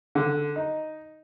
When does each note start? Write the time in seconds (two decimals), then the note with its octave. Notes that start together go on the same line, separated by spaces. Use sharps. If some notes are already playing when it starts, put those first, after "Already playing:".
0.15 D3
0.56 D#4